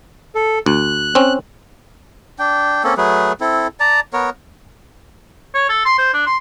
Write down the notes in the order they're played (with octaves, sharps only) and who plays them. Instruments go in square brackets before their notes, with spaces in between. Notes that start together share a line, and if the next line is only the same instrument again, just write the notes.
[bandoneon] A4
[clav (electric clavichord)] D2 [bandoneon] F#6
[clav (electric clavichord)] C4 C#4
[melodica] D4 G5
A#3 C4 C#4 A4
F#3 A3 G#4 B4
C4 E4 A4
D5 A5 A#5
B3 A#4 C#5
[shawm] C#5
A4
C6
C5
D4
C6